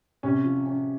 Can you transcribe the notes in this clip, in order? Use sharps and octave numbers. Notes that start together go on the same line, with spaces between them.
C3 C#4
F3
C#4